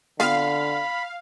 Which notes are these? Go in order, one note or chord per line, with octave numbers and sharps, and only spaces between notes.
D3 B3 C4 F4 F5 B5